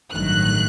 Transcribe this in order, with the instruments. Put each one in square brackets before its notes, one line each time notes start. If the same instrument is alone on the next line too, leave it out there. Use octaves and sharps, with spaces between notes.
[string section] A1 G2 D#3 F#3 A3 F#6